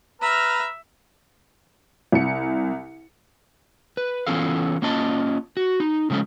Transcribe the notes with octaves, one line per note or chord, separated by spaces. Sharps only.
B4 E5 A#5 F6
C2 C#7
B4
E3 B3 C#4 F4 A4 F5
A#3 C#4 F4 D#5 A5
F#4
D#4
C#3 F3 G#3 A3 C#4